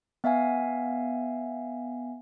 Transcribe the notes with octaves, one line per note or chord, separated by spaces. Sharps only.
B3 E5 F5 G#5